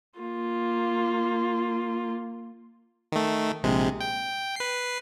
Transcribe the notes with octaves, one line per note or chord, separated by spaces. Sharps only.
A#3 F4
D#3 A3
A#1 C3 G#3
G5
B4 C7